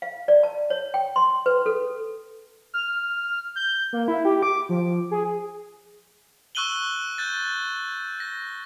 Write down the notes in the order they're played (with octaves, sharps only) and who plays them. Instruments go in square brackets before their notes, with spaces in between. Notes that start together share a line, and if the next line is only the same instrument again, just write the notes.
[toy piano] F5
D5
A5
C#5
G5
C6
B4
A4
[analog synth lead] F6
G6
A#3
E4
G4
D6
F3
G#4
[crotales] C#6 E6 F#6 D#7 F#7 G7
F#6 G6 A6
A#6